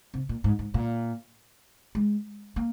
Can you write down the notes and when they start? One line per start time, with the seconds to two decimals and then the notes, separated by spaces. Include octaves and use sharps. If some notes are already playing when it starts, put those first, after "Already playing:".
0.14 C3
0.29 A#2
0.44 G#2
0.59 G#2
0.74 A#2
1.95 G#3
2.56 A#3